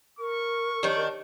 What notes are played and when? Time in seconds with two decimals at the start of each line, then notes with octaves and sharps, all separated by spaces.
0.19 A#4 C#6
0.83 D#3 D4 G4 C#5